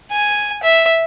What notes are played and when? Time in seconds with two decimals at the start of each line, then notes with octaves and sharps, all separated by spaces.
0.11 G#5
0.63 E5